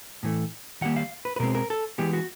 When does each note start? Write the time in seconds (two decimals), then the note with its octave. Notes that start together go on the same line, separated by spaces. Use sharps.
0.23 A2 E3 A3
0.81 D#3 G3 A#3 F#5
0.96 F5
1.25 B4
1.36 B4
1.40 B2 G#3 C4 A#4
1.55 A#4
1.70 A4
1.98 E3 G#3 B3 G4
2.13 F#4